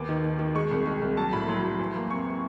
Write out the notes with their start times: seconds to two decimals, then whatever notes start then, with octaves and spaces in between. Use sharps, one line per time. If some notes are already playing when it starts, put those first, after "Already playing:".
Already playing: D#2 B3 D6
0.09 D#3
0.24 D#3
0.39 D#3
0.55 G#3 C#6
0.71 C2
0.86 G#3
1.02 C2
1.17 F#3 A5
1.33 A2 B5
1.48 F#3 C6
1.64 F#3
1.79 E2 C6
1.96 A#3
2.10 C3 C#6
2.26 C3